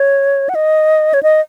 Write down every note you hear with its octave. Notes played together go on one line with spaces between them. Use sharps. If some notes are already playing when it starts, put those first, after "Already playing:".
Already playing: C#5
F#5
D#5
C#5
D#5